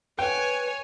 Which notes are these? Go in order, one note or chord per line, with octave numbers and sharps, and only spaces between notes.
B4 C#5 G5 G#5